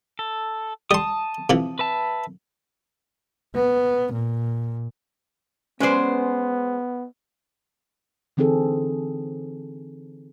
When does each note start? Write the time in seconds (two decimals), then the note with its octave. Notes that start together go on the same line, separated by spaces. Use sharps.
0.19 A4
0.91 G3 A5 C6 D#6
1.50 C3 E3 F3
1.79 B4 E5 A5
3.55 B3
4.12 A#2
5.80 G#3 B3 C#4 B4 C5 D5
8.37 D3 E3 C4 D#4 G#4 A4